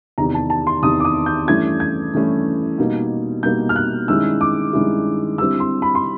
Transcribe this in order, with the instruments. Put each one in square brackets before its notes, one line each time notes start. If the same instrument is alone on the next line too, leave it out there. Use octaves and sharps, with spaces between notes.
[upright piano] E2 C3 D#3 A#5
A5
A5
C6
E2 C3 D#3 D#6
D6
D#6
G6
G2 E3 A3 C#4 E4 G#6
G#6
G2 E3 A3 C#4 E4
B2 G3 A#3 D#4
B2 G3 A#3 D#4 G6
F6
F#6
G2 D#3 G#3 C#4 E4 E6
D6
G2 D#3 G#3 C#4 E4
D3 G3 C4 E4 E6
C6
B5
C6